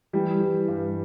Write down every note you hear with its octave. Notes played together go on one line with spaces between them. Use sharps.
E3 G3 G4
E3
G2